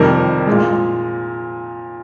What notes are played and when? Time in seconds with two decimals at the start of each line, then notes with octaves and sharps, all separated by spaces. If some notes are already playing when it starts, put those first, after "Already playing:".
Already playing: F2 C3 D#3 G3 A#4
0.47 A#2 G#3